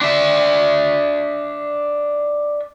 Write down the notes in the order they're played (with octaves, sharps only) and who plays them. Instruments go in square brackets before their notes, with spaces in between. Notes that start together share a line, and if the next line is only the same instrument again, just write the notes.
[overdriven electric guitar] D4 E5